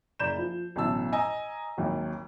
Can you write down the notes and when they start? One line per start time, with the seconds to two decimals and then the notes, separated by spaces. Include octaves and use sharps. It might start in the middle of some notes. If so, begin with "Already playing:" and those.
0.19 F#1 D5 A#5 B5 G6 E7
0.38 F3
0.76 A1 D2 B2 F#3 A5 E6
1.12 D#5 G#5 A#5 E6
1.77 G#1 D#2 F#3